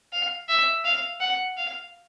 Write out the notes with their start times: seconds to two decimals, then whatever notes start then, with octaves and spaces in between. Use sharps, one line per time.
0.13 F5
0.49 E5
0.85 F5
1.20 F#5
1.57 F5